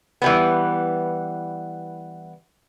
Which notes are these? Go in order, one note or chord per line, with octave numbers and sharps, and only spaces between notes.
E3 G3 B3